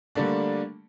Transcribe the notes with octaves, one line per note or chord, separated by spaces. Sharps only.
D3 G3 A3 A#3 D4